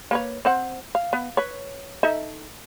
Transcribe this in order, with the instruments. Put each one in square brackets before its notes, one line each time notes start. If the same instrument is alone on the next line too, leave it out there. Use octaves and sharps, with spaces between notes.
[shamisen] A#3 B4 C#5
C4 C5 F#5
F5
B3
B4 C#5
D#4 A4 E5